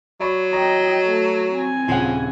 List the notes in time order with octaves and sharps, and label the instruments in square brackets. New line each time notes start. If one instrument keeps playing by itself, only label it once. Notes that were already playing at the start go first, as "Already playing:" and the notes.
[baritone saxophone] F#3 [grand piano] D5 B5 C#6
[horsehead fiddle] D#5 G5 [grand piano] A#5
[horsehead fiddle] A3
C4 G#5
[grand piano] D#1 C#3 F#5 [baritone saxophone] F3